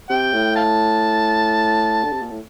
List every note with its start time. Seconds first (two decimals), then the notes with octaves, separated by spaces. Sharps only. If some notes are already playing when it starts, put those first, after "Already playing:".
0.10 C3 G5
0.33 A2
0.56 F5 A5
2.04 D3
2.12 C3
2.22 A#2
2.30 A2